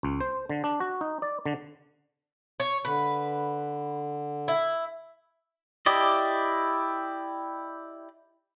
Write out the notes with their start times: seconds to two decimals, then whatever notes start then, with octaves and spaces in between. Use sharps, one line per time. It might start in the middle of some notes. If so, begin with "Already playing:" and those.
0.03 C#2
0.21 C5
0.49 D3
0.64 D4
0.80 F#4
1.01 D#4
1.22 D5
1.46 D3
2.60 C#5
2.85 D3 B4
4.48 E4
5.86 E4 G4 D5 D#5